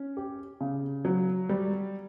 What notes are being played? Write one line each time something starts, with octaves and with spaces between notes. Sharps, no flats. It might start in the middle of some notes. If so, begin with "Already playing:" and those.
Already playing: C#4
G4
C#3
F#3
G3